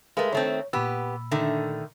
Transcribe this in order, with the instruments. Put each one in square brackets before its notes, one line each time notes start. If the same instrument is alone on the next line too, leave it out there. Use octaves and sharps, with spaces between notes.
[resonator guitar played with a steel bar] G#3 A3 [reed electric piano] A#4 B4 F5
[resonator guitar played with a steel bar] D#3 A3 C4 [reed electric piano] C#5
[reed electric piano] A#2 B5 E6 [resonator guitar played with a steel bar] B3 G4
[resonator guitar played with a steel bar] D3 D#3 A3